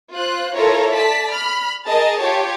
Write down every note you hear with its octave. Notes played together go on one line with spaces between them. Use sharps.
F4 C5 F#6
E4 F4 A4 A#4 C#5 A#5
D5 A5 B6
B5 F6
G#4 A#4 D#5 A5
F4 G4 C#5